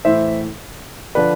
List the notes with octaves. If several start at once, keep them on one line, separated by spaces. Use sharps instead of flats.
A2 E3 C5 E5
D3 F3 B4 D5